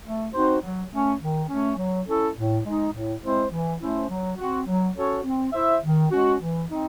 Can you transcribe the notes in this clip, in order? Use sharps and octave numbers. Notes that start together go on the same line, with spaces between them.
A3
C4 D#4 F#4 C5
F#3
A3 C#4
D#3
A3 C#4
F#3
C#4 E4 A4
A2
G#3 D#4
A2
G#3 C4 E4 C5
E3
A3 C#4 E4 C5
F#3
C4 F#4
F#3
C#4 F#4 A4 C#5
C4
E4 C5 E5
D#3
G#3 C#4 F#4
E3
C4 D#4